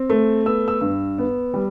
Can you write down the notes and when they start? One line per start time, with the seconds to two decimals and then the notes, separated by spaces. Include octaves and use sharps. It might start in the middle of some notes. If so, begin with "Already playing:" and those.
Already playing: C4
0.10 A3
0.46 B3 E6
0.68 E6
0.81 G2
1.18 B3
1.54 G3